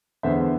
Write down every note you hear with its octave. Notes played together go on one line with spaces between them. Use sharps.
E2 D3 G#3 B3 C5 E5